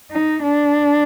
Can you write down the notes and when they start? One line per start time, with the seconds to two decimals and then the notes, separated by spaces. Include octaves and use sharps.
0.12 D#4
0.43 D4